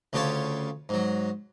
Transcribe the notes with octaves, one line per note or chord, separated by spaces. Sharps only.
D2 C#3 F4 G4 C#5 A5
G#2 F#3